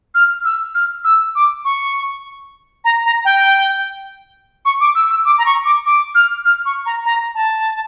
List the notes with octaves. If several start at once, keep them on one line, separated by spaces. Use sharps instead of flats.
F6
E6
F6
E6
D6
C#6
A#5
A#5
G5
C#6
D6
E6
E6
D6
A#5
C#6
D6
D6
F6
F6
C#6
A#5
A#5
A5